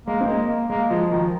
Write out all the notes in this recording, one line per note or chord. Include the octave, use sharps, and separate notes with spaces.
G#3 A#3
C4
G#3 A#3
A#3
G#3 A#3
F3 G#3
D#3 F3